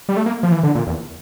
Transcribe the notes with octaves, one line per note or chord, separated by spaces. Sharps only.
G3
A3
A#3
F3
E3
D3
A#2
E2